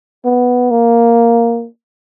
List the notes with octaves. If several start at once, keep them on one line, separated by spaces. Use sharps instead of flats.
B3
A#3